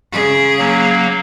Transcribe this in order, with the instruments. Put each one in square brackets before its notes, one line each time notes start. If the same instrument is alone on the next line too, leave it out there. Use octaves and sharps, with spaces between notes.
[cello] C#3 G#4
[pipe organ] F#3 A#3